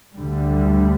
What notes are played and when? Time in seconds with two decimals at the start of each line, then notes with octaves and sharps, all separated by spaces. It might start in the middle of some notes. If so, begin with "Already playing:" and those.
0.15 D2 D3 G3